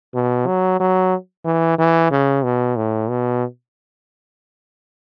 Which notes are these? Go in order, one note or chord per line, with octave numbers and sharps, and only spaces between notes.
B2
F#3
F#3
E3
E3
C#3
B2
A2
B2